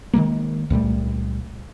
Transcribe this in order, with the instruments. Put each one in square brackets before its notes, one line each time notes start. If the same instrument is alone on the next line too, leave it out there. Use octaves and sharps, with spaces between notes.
[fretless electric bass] D#3 E3 G#3 A#3
C#2 A#2 G3 A3